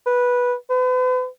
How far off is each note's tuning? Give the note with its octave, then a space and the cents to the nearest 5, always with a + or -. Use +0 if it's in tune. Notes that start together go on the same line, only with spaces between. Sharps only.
B4 -10
B4 +40